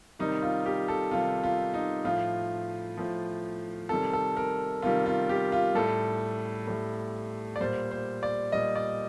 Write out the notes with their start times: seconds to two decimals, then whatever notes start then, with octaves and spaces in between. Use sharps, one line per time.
0.19 C3 D#3 G3 D#4
0.42 F4
0.66 G4
0.88 A4
1.11 C3 D#3 G3 F4
1.43 F4
1.74 D#4
2.04 A2 F3 F4
2.97 A2 F3
3.89 C3 D#3 G3 A4
4.13 A4
4.37 A#4
4.82 C3 D#3 G3 F4
5.06 F4
5.29 G4
5.52 F4
5.75 A2 G3 A4
6.67 A2 G3
7.56 D5
7.61 A#2 G3 C5
7.91 C5
8.23 D5
8.52 A#2 G3 D#5
8.76 D5